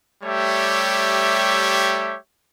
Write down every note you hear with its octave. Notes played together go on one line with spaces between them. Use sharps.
G3 A3 G4 C#5 E5